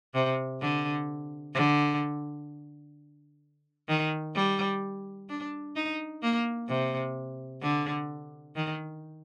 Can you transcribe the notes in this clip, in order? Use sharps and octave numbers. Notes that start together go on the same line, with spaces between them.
C3
D3
D3
D#3
G3
D4
D#4
A#3
C3
D3
D#3